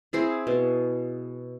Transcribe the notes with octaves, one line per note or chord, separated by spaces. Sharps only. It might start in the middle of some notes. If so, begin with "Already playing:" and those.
C4 E4 G#4
B2